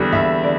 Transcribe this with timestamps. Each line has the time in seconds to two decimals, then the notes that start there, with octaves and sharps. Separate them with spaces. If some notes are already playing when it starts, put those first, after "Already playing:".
Already playing: E2 D3 G3
0.12 E2 E5
0.43 D3 D5